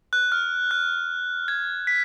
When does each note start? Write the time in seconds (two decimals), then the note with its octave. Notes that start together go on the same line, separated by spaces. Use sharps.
0.13 F#6
0.32 F6
0.71 F#6
1.48 G#6
1.87 B6